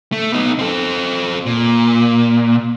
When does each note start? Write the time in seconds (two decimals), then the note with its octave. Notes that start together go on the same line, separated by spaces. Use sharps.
0.12 A3
0.33 B3 D#4
0.59 C4 A4
1.46 A#2